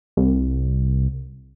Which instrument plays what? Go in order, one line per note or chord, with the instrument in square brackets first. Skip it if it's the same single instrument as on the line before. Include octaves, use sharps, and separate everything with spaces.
[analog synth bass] C2